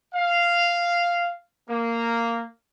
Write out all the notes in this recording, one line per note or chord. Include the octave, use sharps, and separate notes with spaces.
F5
A#3